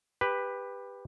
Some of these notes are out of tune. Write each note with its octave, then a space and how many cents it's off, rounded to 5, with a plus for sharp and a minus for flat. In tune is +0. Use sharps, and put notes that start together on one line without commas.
G4 +20 B4 +0